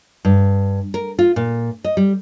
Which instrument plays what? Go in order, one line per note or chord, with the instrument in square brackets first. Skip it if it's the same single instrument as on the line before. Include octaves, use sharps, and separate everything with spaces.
[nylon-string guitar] G2
A#4
F4
A#2
D#5
G3